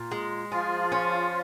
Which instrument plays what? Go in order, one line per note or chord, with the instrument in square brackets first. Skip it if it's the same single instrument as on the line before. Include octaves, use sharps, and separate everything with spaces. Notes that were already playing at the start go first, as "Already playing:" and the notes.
Already playing: [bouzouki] A#2
G#3
[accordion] F3 F4 [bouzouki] G#4
[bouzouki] C#4